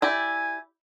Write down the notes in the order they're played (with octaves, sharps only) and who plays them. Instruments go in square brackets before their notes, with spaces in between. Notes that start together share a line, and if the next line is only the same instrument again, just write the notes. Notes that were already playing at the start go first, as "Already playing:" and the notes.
[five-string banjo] E4 G4 D5 [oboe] G#5